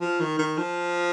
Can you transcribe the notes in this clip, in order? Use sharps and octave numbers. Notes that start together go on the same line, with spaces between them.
F3
D#3
D#3
F3